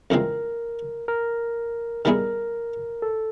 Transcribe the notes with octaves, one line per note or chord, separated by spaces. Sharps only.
F2 C#3 E3 G#3 C4 A#4
A#4
D#3 G3 B3 E4 G#4 A#4
A4